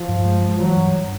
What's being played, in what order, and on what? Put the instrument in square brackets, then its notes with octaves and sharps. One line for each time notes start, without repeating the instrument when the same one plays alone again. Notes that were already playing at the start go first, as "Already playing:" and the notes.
Already playing: [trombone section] F3
[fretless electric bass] G2
G#3
G#3
[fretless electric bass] E3 [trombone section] F#3
[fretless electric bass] G2
G2